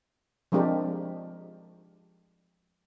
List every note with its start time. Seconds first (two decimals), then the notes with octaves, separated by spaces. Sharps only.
0.52 F3 G#3 C4 D4 G4 A#4